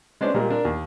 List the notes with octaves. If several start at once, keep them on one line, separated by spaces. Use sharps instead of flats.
G#3 B3 C#4 D4 C5 D5
A#2 G3 G#3 A#4
D4 A#4
D#2